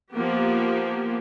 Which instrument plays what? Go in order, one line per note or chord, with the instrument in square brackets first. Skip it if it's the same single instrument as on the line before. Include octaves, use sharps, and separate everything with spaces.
[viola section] F3 A#3 B3 G4